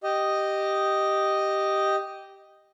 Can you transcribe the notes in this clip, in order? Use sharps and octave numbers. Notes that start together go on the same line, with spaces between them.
G4 D#5